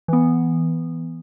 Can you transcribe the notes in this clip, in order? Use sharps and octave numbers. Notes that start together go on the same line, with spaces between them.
E3 B3